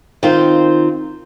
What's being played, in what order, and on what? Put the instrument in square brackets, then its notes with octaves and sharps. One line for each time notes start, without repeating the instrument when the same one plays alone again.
[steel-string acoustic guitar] D#3 C4 F4 C5